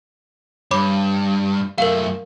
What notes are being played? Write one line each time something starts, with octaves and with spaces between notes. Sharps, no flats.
G2 C#5 B5 D6
F#2 A3 A#4 F5